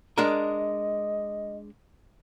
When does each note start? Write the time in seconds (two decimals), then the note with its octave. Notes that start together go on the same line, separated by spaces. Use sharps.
0.18 G#3 D4 A#4 D#5